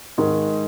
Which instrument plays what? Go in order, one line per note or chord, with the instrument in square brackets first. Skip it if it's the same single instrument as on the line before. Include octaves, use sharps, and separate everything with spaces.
[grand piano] G#2 D#3 G#3